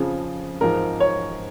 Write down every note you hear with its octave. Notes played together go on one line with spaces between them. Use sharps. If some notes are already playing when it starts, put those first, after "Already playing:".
Already playing: F2 C#3 F3 G#4
G#2 F3 A#4
C#5